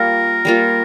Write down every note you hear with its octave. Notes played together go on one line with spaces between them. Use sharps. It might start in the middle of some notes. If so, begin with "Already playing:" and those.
Already playing: G3 A#3 F4 A#4
G3 A#3 F4